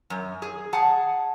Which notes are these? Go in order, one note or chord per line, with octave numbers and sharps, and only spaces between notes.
F#2
G#4
G#4 F#5 A5